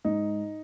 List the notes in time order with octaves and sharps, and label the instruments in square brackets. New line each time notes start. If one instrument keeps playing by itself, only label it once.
[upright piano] G#2 D#4